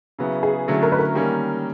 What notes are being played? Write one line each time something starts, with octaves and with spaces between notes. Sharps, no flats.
C#3 F#3 B3 E4
G#4
D3 F#3 A3 C#4 E4
A#4
B4
A#4
D#3 G3 A#3 C#4